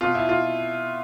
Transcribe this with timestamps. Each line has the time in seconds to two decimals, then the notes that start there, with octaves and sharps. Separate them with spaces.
0.01 B2 F4
0.15 E4
0.29 F4